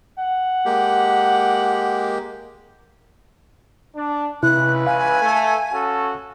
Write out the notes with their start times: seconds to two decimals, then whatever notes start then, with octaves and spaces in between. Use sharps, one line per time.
0.18 F#5
0.65 G#3 A#3 G4
3.95 D4
4.43 C#2 C3 E3 E4 B4 F#6
4.87 F5 G#5
5.21 A3
5.73 C#4 F#4 A4